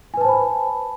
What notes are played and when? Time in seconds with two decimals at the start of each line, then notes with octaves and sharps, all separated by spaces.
0.14 G#5
0.17 B4
0.21 A5
0.25 C5
0.28 B5